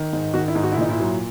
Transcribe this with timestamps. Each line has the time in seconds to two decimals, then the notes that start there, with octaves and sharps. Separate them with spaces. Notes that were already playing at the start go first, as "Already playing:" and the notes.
Already playing: D#3
0.13 G#2
0.34 D#3 F#4
0.48 E4
0.55 G#2
0.64 F#4
0.72 E4
0.77 A#2 D#4
0.90 E4
1.00 F#3